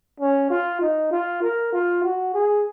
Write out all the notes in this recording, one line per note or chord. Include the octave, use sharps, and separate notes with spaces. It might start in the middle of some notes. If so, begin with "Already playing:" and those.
C#4
F4
D#4
F4
A#4
F4
F#4
G#4